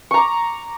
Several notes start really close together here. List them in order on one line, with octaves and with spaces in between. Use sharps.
C#6 A#5 D6